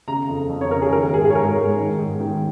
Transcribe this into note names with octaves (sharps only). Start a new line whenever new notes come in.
C#3 A#5
F2
F2
C#5
C#3 A#4
G#4
D#3 A#4
G#2 G#4
G#4
C#5
G#2 A#4
G#2
D#3
G#2
D#3